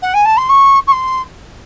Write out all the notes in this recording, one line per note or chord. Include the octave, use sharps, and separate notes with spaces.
F#5
G#5
A5
C6
C#6
C#6
C6